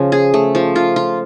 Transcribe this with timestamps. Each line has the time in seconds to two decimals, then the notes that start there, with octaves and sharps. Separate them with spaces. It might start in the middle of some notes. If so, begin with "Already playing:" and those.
Already playing: C#3 F3 C#4
0.12 G#4
0.34 A3
0.55 F3
0.76 F4
0.96 F4